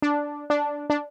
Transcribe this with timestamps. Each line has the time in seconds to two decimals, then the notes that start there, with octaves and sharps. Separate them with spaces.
0.02 D4
0.50 D4
0.90 D4